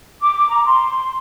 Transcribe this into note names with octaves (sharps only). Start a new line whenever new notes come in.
D6
A#5
C6